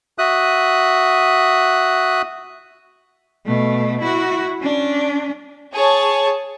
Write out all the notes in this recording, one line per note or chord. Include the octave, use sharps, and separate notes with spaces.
F#4 E5 D#6 F#6
B2 A3
E4 F#4
C#4 D4
G#4 C#5 A5